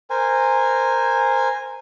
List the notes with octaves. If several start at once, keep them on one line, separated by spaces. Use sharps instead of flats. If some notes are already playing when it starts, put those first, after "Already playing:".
A#4 C5 G#5